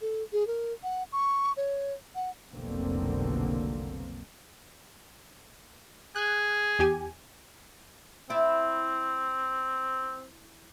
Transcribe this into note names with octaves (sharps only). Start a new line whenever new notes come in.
A4
G#4
A#4
F#5
C#6
C#5
F#5
F1 B1 B2 D3 A#3 C4
G#4 F#6
E2 G4 G#5
C4 E4 D5